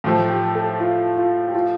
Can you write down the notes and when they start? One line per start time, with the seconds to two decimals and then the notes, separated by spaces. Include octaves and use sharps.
0.04 A2 F3 A3 G4
0.29 G4
0.55 A4
0.80 F4
1.17 F4
1.48 G4
1.54 F4